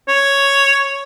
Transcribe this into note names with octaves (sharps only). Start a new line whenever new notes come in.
C#5